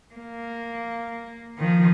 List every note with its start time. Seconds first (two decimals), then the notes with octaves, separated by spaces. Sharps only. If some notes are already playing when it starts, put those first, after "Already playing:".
0.15 A#3
1.58 D#3 F3